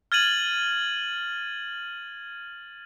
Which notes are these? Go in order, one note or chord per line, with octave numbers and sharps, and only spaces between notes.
F6 G#6 A6 D#7 F#7